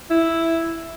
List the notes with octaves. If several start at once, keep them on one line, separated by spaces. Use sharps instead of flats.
E4